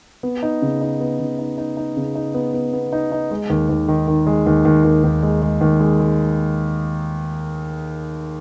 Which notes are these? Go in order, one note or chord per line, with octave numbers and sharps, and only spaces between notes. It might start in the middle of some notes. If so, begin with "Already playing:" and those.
B3
D#4
C#3
D#4
B3
C#3
D#4
D#4
D#4
C#3
D#4
B3
B3
B3
D#4
D#4
G#3
D#2
D#2
D#3
D#3
G#3
D#2
D#2
D#2
D#2
G#3
G#3
D#2
G#3
G#3